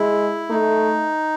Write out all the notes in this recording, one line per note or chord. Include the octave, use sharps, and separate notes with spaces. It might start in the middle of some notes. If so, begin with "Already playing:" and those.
Already playing: G#3 E4
A3 D#4